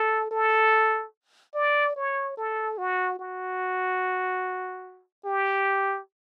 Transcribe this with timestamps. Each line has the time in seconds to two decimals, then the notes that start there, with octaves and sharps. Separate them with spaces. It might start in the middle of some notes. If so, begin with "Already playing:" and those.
Already playing: A4
0.31 A4
1.55 D5
1.96 C#5
2.37 A4
2.78 F#4
3.19 F#4
5.25 G4